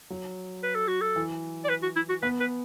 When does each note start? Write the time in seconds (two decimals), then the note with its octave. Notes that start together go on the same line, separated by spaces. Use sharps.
0.10 F#3
0.63 B4
0.75 A4
0.88 F#4
1.01 A4
1.16 E3
1.65 D5
1.69 B4
1.83 F#4
1.96 E4
2.09 F#4
2.22 B3 B4
2.40 B4